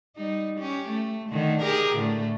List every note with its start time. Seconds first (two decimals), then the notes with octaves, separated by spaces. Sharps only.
0.17 G3 D#4
0.59 C#4 G4
0.89 A3
1.30 D3 D#3 A3
1.62 G4 G#4 A#4
1.96 A2 D3 A3